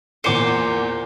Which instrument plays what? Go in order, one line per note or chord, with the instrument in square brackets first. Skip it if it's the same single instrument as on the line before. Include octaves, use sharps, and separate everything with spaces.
[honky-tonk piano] E2 A#2 C#7 [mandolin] C5 G#5 D6